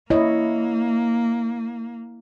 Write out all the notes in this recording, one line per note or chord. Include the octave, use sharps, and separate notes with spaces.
A#3 E4 C#5 D#5